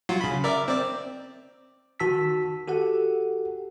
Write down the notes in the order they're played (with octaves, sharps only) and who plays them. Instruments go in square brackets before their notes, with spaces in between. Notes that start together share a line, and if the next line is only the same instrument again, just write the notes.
[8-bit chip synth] F#3 F4 F#4
C#3 B5
A#4 D5 E5
C4 D5
[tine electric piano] D#3 F#4 A5 E6 B6
F#4 G4 A4 F#5